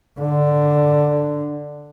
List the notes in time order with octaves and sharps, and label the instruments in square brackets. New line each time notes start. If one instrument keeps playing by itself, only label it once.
[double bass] D3 [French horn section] D4